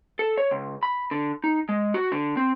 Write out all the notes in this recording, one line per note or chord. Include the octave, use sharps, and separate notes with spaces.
A4
C#5
C#2
B5
D3
D#4
G#3
F#4
D3
C4